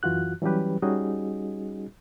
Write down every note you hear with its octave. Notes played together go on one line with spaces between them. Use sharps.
F#2 E3 F4 F#4 F#6
E3 F#3 G3 C#4 G4 B4
G3 C#4 D#4 F#4 G#4 D#5